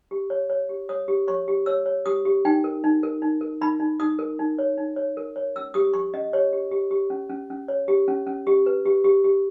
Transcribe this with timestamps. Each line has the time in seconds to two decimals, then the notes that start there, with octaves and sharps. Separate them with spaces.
0.11 G4
0.30 C#5
0.50 C#5
0.69 G4
0.89 C#5 D#6
1.08 G4
1.28 C#5 C#6
1.48 G4
1.66 C#5 E6
1.86 C#5
2.06 G4 D#6
2.25 G4
2.45 D#4 G5
2.64 A#4
2.84 D#4
3.03 A#4
3.22 D#4
3.41 A#4
3.61 D#4 B5
3.80 D#4
4.00 D#4 D#6
4.19 A#4
4.39 D#4
4.59 C#5
4.78 D#4
4.96 C#5
5.17 A#4
5.36 C#5
5.56 C#4 E6
5.74 G4 D#6
5.94 G4 C#6
6.13 C#4 D#5
6.33 G4 C#5
6.53 G4
6.71 G4
6.91 G4
7.10 C#4
7.30 C#4
7.50 C#4
7.68 C#5
7.88 G4
8.08 C#4
8.27 C#4
8.47 G4
8.66 B4
8.86 G4
9.04 G4
9.24 G4